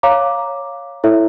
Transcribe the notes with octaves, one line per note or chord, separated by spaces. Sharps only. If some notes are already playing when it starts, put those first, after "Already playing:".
C#5 F5 A#5 D6
E4 A4 C#5 E5